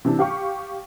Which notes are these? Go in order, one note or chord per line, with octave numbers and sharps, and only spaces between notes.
C3 E3 D4
G4 F5 G5 C#6